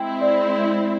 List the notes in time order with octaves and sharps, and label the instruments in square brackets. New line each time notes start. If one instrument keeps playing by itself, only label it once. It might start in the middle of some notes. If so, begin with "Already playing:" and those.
Already playing: [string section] G#3 C4 E4 [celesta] G5
[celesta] D5